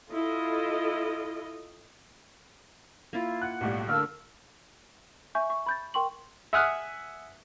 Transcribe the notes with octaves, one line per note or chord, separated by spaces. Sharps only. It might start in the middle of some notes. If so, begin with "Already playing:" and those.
E4 F4 A4 D#5
A#3 E4 F4
F#5 F#6
B1 A2 G3
D3 A3 A#3 D4 E6 F6
E5 G#5 C#6 G6
C#6
B5 G6 A6
A#4 G5 C6 C#6 F#7
E5 F#5 G#5 D#6 F6 F#6